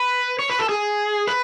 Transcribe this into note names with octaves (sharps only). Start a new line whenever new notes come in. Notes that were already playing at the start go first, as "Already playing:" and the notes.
Already playing: B4
C#5
B4
A4
G#4
B4